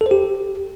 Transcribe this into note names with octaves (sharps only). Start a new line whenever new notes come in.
A4
C5
G4